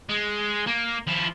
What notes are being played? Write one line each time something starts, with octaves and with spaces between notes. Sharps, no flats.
G#3
A#3
F3 E4